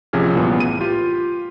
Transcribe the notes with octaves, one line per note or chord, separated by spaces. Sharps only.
A1 C3 F3 C#4 G#4 F6
C2 G2 A#2 E3 B3
A2 D#7
F4 G4